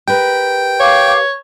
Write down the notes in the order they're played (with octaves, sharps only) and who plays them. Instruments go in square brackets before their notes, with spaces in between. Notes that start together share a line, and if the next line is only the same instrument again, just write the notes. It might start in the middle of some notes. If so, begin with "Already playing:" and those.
[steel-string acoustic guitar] G4 A#4 B4 [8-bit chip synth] G5
[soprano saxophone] C#5 [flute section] F5 D6